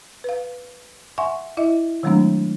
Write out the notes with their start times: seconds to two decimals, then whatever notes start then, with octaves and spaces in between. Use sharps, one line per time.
0.24 B4 F5
1.18 E5 F#5 G#5 C6 C#6
1.57 E4 D#5 E5
2.03 D#3 F#3 G#3 A3 C4 D4